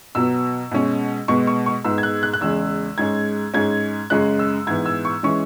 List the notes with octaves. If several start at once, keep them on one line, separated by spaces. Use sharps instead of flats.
B2 F#3 B3 E6
B2 G#3 C#4
B2 G#3 B3 C#6
C#6
C#6
G#2 G#3 B3 E6
G#6
F#6
F#6
F#6
E2 C#3 G#3 E6
G#2 G#3 C#4 G#6
G#2 G#3 C#4 G#6
F#2 C#3 G#3 C#4 F#6
E6
G#2 E3 B3 G#6
E6
C#6
E3 G#3 C#4 C#6